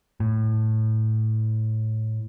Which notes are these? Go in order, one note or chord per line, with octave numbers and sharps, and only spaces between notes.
A2